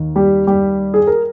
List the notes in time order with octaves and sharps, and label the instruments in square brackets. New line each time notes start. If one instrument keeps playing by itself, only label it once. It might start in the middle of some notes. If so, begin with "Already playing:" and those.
Already playing: [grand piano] D#2 D#3
G3 G4
G3 G4
G#4
A#4